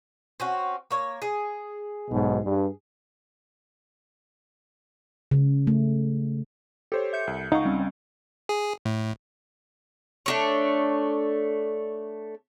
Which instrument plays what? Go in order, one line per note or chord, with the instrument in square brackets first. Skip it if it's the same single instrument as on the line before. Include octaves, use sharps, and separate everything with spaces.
[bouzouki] C4 C#4 F#4
A#3 C#5
G#4
[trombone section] B1 G#2 B2
G2
[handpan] C#3
A3
[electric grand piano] G4 C5 C#5 [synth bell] A4
[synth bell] E5 G6 C#7
[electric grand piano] C2
[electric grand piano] C#2 C#6 [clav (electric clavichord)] D#4 [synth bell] D#5 F5 F#5
[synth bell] G3 C4 C#4
[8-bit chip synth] G#4
A2
[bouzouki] A3 D4 C#5